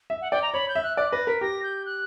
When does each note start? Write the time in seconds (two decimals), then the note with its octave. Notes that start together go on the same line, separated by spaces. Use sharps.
0.10 E5
0.21 F#5
0.31 D5 G5
0.42 A#5
0.53 C#5 B5
0.69 G6
0.75 E5
0.83 F#6
0.97 D5 F#6
1.12 B4 A#6
1.27 A#4 B6
1.41 G4 A#6
1.63 G6
1.86 F#6